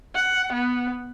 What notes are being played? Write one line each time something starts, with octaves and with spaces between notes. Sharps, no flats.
F#5
B3